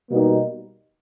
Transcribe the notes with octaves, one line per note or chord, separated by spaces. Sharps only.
B2 G3 A#3 D#4